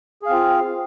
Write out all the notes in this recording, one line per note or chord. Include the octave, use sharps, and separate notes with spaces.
C4 F4 G#4 F5